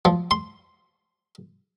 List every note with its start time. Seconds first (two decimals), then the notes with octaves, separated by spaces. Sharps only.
0.05 F3
0.31 C6